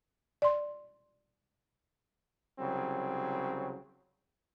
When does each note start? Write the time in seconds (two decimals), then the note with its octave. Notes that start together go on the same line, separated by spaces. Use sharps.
0.42 D5 C6
2.59 C2 C#3 F#3 C4